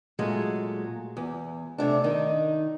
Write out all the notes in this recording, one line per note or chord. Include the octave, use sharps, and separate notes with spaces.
A#2 F#3 G#3 A3
E2
C3 A3 D4
D#3 D#4